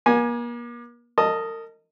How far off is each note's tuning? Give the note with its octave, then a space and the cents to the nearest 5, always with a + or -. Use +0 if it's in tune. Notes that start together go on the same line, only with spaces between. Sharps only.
A#3 +40 G#5 +0
A#4 -40 D#5 +0 A5 +0